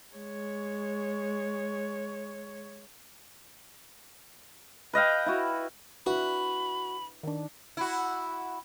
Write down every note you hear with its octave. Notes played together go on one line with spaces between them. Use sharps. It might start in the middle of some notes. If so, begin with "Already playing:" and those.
G#3 C#5
B4 D#5 F5 G5
E4 F#4
D4 E4 F#4 B4 B5
D#3 D4
E4 F#4